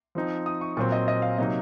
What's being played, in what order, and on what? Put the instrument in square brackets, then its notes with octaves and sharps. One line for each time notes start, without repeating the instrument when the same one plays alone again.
[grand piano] F3 C4 D#4
D#6
C#6
A#2 F#3 C4 C#6
D#5
D#5
F5
C3 F#3 A#3 D#4 D#5